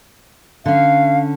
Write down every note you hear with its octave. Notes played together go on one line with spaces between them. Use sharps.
D3 C#4 F5